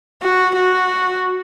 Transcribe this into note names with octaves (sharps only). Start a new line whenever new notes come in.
F#4
F#4